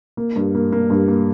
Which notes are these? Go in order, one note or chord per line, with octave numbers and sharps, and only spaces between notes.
A#3
G2
A#3
A#3
G2
A#3